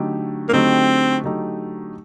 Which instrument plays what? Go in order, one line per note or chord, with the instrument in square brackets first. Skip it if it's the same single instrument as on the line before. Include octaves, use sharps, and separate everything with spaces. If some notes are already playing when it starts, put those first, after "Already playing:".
Already playing: [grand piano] D3 F#3 A3 D#4 G4
[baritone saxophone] A#3
[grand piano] D3 F#3 A3 D#4 G4 [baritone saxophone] C4
[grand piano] D3 F#3 A3 D#4 G4